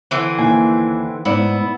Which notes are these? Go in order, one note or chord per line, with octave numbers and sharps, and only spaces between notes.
D3 E3 C4
D#2 G#5
G#2 B3 E4 D5